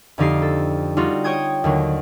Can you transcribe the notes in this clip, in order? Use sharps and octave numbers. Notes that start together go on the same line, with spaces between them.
F2 D3 F3 D#4 G4 C7
A4
G3 D#4 F4 F#4
C#5 G5 D#6 G6 G#6
D#2 D3 F#3